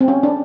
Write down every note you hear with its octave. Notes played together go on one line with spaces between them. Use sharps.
C4
C#4
D4